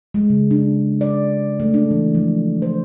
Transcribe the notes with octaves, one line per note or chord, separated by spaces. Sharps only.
G#3
C#3
D4
D5
A3
D4
E3
F3
C5